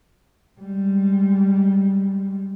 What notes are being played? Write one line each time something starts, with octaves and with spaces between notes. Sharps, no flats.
G3 G#3